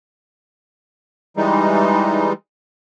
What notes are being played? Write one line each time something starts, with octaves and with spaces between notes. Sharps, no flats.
E3 G3 G#3 D#4